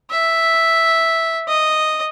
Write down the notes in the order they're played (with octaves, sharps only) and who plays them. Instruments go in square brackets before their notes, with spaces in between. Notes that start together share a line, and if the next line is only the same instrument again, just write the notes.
[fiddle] E5
D#5